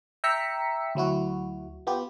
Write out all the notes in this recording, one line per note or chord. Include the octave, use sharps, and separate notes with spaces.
E5 G5 A#5 E6 B6 C#7
D2 F#3 E4 F#4
B3 F4 G4